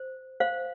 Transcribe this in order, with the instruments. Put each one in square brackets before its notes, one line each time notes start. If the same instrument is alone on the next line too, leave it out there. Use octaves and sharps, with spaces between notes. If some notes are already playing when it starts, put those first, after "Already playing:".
Already playing: [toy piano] C5
C5 F5